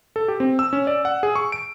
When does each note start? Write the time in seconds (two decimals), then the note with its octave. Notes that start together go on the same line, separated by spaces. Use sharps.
0.16 A4
0.28 G4
0.40 C4
0.59 E6
0.73 C#4
0.87 D5
1.05 F#5
1.23 G#4
1.35 C#6
1.52 D7